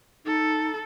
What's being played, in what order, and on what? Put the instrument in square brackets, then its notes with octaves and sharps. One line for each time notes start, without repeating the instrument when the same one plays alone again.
[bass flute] D#4 [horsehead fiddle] A4